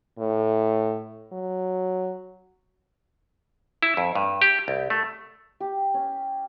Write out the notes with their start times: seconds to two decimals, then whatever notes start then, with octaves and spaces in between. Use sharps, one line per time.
0.19 A2
1.32 F#3
3.83 E4
3.97 F2
4.15 G2
4.42 G4
4.68 C2
4.90 A3
5.60 G4
5.94 C#4